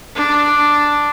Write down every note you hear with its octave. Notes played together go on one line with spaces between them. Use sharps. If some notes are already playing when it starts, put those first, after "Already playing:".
D4